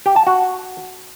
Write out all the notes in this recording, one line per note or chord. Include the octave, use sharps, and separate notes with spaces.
G4
A5
F#4